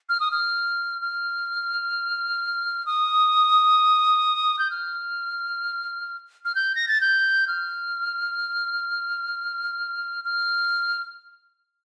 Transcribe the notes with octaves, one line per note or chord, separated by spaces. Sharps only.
F6
D#6
F6
F6
D#6
G6
F6
F6
G6
A#6
A6
G6
F6
F6